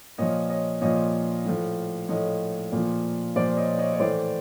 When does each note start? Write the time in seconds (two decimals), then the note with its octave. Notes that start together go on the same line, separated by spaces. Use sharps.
0.18 A#2 F3 C#5 D#5
0.49 C#5 D#5
0.81 A#2 F3 C#5 D#5
1.45 A2 F3
2.09 A2 F3 C#5 D#5
2.72 A#2 F3
3.36 A#2 C5 D5
3.39 F3
3.57 C#5 D#5
3.78 C#5 D#5
3.93 C#5
3.99 A2 E3 C5 D5